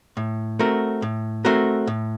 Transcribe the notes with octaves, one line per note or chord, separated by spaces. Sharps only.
A2
A3 C4 F#4 A#4
A2
A3 C4 F#4 A#4
A2